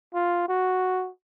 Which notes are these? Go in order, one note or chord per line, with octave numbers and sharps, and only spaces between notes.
F4
F#4